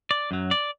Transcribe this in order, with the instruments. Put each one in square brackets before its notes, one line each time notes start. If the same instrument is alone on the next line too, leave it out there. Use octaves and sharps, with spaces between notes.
[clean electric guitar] D5
F#2 F#3
D5